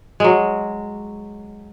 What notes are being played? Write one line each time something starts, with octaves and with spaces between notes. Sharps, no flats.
F#3 G#3